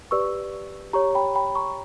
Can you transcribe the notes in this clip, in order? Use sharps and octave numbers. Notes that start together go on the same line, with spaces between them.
G4 B4 D5 C#6 E6
G4 C#5 A#5 C#6
G5 B5
G5 B5
A#5 C#6